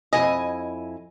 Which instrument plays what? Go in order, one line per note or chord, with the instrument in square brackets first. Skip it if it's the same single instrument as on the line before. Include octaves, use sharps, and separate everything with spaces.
[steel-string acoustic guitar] F2 E4 G#5 [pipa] D#5